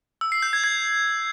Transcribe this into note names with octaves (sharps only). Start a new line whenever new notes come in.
E6
C7
G6
G#6
G#6